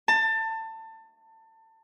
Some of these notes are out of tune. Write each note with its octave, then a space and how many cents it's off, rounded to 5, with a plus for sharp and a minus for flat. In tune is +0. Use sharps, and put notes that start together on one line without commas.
A5 +25